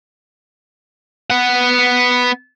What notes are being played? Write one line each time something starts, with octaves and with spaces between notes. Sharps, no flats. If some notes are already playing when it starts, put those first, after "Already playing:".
B3 F#5